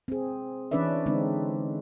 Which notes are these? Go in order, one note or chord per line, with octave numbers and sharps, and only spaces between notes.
C4 G#4
E3 C#4 D4 B4 D5 E5
D3 G#3 C4 D4 D#4